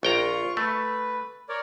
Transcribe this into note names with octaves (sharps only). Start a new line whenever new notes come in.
A#1 F4 G5 A#5 C#6
A3 B4
A#4 C#5 D5